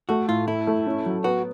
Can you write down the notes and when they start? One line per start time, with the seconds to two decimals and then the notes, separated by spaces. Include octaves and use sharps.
0.09 A3 F#4
0.28 A2 F4
0.47 A3 E4
0.67 A3
0.87 C#4
1.06 F#3
1.24 B3 F#4